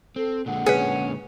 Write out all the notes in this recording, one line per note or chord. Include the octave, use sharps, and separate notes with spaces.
C4 A4
A#2 D3 G#3 F#5
C#4 G#4 B4